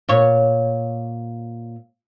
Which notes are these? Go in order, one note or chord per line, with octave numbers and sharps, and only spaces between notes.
A#2 C#5